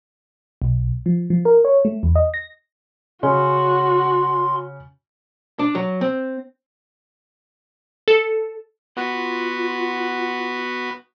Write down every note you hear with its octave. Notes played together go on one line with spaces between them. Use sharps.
B1
F3
F3
A#4
C#5
A3
E2
D#5
A#6
C#3 C#4 F#4 C6
D4
F#3
C4
A4
B3 F4 F#4 B4